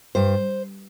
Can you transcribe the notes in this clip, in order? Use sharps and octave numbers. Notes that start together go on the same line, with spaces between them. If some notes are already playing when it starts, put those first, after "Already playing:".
G2 C5